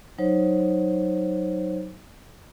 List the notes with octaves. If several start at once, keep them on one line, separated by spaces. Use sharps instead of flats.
F#3 D#4 C5 C#5